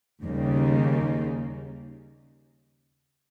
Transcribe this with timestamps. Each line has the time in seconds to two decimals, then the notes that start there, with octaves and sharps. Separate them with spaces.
0.23 D#2 C#3 G3 A#3 D#4